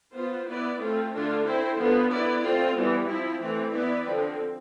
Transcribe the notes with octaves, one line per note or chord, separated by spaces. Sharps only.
B3 F4 C5
B3 E4 B4 D5
A3 C4 F4 A4
D3 A3 D4 F4 A4
C4 E4 A4 C5
D3 F3 B3 F4
B3 E4 B4 D5
A3 C4 F4 C5
E3 G3 B3
F3 C4 E4
E3 A3 C4
B3 E4 B4 D5
D3 F3 C4